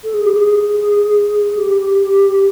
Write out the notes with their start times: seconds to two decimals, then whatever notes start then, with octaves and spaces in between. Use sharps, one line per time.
0.03 A4
0.14 G#4
0.24 G4
0.34 G#4
1.57 G4